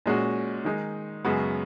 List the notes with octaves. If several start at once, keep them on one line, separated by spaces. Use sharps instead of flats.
A#2 G#3 C#4 F#4
D#3 G#3 D#4
F#2 C#3 G#3 B3 F#4